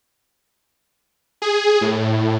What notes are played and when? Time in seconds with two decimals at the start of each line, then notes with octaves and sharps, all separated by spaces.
1.42 G#4
1.81 A2